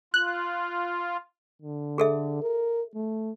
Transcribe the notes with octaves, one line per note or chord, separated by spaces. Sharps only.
F4 F#6
D3
G#4 A4 E5
A#4
A3